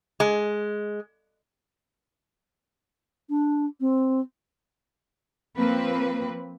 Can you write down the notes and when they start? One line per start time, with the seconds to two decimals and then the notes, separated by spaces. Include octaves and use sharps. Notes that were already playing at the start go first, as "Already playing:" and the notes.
0.20 G#3
3.29 D4
3.80 C4
5.57 F3 A#3 C4 B4